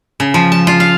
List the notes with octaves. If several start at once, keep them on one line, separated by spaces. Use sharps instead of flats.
C#3
F3
A5
F4
F5